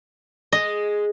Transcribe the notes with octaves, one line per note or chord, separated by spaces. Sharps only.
G#3 D#5